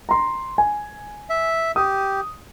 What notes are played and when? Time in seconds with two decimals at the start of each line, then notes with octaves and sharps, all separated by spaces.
0.09 A#5 C6
0.58 G#5
1.30 E5
1.76 G4 D#6